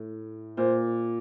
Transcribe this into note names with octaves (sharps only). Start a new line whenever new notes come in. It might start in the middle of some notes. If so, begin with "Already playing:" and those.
Already playing: A2
A#2 C5